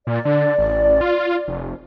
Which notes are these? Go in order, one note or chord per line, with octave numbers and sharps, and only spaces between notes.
A#2 D5
D3
A1
F4
F1